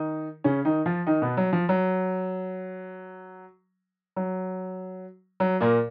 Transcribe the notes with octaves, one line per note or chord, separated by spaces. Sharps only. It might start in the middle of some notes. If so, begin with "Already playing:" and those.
Already playing: D#3 D#4
C#3 C#4
D#3 D#4
F3 F4
D#3 D#4
B2 B3
F#3
F3
F#3
F#3
F#3
A#2 A#3